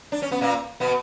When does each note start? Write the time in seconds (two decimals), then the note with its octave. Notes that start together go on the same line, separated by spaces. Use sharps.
0.12 D4
0.22 C#4
0.31 B3
0.41 A#2 A#3
0.80 B2 B3